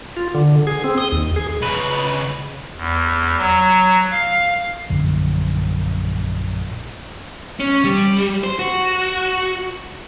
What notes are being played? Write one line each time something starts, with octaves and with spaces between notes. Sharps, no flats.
F4
D3
G#4
C4
D#6
D#2
G#4
C#3 B4
E2
F#3
F5
A#1 F#2 D3
C#4
G3
C5
F#4